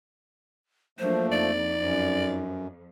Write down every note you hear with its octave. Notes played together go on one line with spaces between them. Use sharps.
F3 F#3 A3 A#3 D4 C5
F2 D#4 D5
F#2